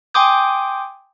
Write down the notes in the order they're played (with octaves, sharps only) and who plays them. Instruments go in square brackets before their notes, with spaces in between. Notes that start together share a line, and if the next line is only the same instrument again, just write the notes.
[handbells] G5 G#5 C6 D6 D#6 G6